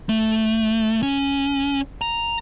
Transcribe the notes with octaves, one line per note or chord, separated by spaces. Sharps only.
A3
C#4
A#5